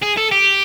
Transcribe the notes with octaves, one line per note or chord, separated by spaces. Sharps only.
G#4
A4
G4